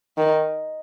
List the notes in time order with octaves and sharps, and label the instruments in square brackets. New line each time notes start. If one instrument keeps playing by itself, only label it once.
[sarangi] D#3